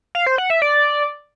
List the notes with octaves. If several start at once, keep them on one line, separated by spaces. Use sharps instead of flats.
F5
C5
F#5
E5
D5